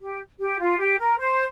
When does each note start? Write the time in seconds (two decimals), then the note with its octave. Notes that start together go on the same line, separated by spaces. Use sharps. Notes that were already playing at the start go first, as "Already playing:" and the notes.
0.01 G4
0.39 G4
0.59 F4
0.79 G4
0.98 A#4
1.17 C5